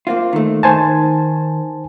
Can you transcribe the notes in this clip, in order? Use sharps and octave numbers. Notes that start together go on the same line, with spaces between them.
A#3 C4 F4
D#3 A3
D#3 C5 G#5 A5